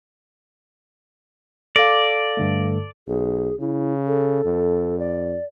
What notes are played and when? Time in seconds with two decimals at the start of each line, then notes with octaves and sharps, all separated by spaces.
1.76 A4 D5 F5 D6 A#6
2.37 G2 D3 A3
3.07 B1 G#4
3.60 C#3 E4
4.07 A4
4.45 F2
4.99 D5